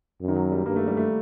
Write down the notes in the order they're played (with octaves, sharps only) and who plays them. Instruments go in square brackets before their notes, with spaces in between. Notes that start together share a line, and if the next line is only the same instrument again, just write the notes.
[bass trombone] F#2
[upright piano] D#3
F#3
G3
[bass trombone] G2 [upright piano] A#3
[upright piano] A3
G3
A3